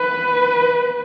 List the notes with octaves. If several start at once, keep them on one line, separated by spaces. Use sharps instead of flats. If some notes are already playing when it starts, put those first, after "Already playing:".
Already playing: B4